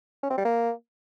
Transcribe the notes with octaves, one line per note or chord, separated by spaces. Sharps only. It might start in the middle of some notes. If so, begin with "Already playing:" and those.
C#4
C4
G3
A#3